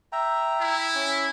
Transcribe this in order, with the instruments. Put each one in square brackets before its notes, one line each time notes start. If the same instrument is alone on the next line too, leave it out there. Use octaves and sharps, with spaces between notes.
[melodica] E5 G5 A#5
[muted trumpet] E4
[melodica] C#4